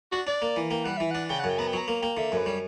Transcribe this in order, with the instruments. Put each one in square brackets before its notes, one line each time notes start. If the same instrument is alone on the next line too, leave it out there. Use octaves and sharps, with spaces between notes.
[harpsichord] D4 [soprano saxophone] F#4
[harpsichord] D4 [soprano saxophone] D5
[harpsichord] A#3
E3
[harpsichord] A#3 [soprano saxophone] G5
[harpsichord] G3 [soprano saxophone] F#5
[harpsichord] E3 [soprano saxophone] E5
[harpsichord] D4 [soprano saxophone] F#5
[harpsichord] C#3 [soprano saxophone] G5
[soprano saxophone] F#5
[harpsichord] F#2
[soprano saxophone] G5
[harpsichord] B3 [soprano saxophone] A#5
[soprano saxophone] G5
[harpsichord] F#3 [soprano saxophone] A#5
[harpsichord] A#3
[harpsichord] A#3 [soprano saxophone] G5
[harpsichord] D3 [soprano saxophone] E5
[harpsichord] F#2
[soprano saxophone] B4
[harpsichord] G3 [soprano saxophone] C#5